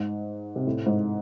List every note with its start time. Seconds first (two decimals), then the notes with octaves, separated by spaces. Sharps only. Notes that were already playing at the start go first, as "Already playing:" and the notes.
Already playing: G#2
0.56 C3
0.67 A2
0.86 G#2